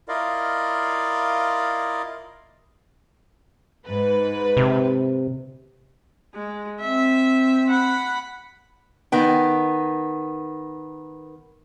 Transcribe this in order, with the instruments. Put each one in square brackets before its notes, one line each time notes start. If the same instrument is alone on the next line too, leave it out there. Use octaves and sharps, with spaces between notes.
[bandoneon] E4 F4 A#4 D5 D#5 F5
[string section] G#2 B4
[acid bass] C3
[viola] G#3
[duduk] C4 [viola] E5
[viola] F#5 B5
[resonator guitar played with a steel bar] D#3 B3 G5